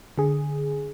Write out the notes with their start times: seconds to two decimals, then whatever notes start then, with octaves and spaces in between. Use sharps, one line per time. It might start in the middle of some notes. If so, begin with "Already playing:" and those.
0.18 D3 G#4